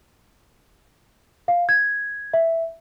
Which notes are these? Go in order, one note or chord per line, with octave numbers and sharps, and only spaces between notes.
F5
G#6
E5